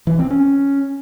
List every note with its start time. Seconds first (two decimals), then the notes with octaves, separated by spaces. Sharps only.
0.07 E3
0.19 C4
0.31 C#4